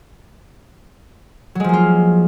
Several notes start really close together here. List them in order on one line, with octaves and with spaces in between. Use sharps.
F#3 G#3 F3 A#3 F4